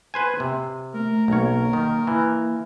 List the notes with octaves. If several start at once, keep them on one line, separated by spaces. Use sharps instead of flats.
B4 C5 G#5
C3
A3 A#4
B1 A#3 A#4 C#5
D#3
E3